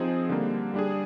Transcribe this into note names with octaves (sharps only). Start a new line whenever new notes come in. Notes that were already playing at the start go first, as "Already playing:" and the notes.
Already playing: F3 C4 D#4 G#4
D3 G3 A#3
G3 D4 G#4